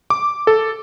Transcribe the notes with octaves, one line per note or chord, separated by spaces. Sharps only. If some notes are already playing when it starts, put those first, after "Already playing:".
D6
A4